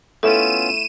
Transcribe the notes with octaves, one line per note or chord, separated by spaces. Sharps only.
A3 B3 C#4 E4 F4 A4 D#7 E7